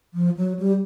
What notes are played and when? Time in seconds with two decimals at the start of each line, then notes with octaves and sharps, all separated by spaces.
0.14 F3
0.37 F#3
0.59 G3